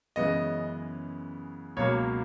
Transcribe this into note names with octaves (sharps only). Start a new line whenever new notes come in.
F#2 C#3 E3 G#3 B3 D#5
C#2 B2 F#3 A#3 C#5